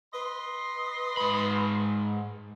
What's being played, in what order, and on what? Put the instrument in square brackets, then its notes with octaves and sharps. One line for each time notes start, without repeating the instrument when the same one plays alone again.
[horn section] B4 D#5 C6
[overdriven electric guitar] G#2 B5